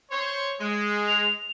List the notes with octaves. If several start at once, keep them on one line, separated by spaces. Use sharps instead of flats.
C5 C#5
G#3
F7